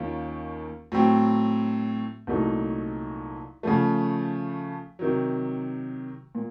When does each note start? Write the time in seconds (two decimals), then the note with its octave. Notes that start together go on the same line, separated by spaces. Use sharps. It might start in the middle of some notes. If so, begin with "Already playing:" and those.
Already playing: D#2 D#3 A#3 C#4 F4
0.92 A2 F#3 C4
2.27 C2 A#2 F#3 A3 D#4
3.63 C#3 F3 A3
4.99 C3 D#3 F#3
6.35 A#2